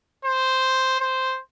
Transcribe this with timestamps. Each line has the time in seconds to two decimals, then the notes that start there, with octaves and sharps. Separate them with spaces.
0.25 C5
1.00 C5